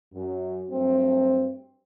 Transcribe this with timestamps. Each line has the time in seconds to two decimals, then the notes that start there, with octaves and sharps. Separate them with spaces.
0.13 F#2
0.70 G2 F#3 A3 C4